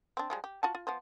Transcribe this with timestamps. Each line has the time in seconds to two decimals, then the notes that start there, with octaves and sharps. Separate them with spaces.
0.17 C4 D4
0.30 F3 G3 G#3
0.44 G4
0.63 F4 F#4 A5
0.75 F4
0.87 F3 B3 C5